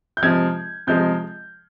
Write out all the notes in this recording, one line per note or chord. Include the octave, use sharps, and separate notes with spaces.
G6
C3 F3 G#3 G#6
C3 F3 G#3 G6